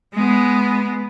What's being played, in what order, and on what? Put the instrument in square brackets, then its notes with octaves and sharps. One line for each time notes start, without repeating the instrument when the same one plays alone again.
[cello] G#3 B3